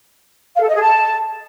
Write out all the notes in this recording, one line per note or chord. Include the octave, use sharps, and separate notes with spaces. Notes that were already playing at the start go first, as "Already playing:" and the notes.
F5
A4
D#5
G#4
A5